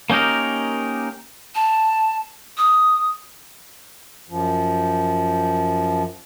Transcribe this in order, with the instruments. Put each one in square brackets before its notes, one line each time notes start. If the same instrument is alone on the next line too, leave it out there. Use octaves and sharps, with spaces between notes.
[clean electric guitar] A#3 C#4 D#4 G4 A#4
[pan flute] A5
D#6
[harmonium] F#2 F3